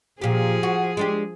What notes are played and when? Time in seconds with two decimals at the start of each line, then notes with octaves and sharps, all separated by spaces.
0.21 A#2 F3 G4 G#4
0.63 F#4
0.97 G#3 D4 G4